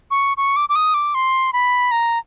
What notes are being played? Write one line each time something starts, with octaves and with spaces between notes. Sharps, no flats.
C#6
C#6
D6
D6
D#6
D6
C6
B5
A#5